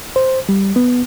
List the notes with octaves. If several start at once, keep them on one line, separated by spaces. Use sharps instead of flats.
C5
G3
B3